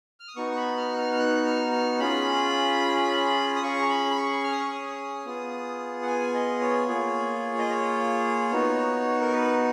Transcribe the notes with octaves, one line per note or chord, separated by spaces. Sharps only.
F6
D#6
B3 D#4 F#4 C#6
C#6
B5
F6
F#6
F6
F6
F#6
F6
F6
C#4 F4 G#4 B5
D#6
C#4 G#4 C#6
A#5
B5
B5
C#6
F6
D#6
C#6
D#6
B3 F4 G#4
F#5
G#5
D#5
C#5
A#3 F4 G#4
D#5
C#5
B3 D#4 F#4
A#4
B4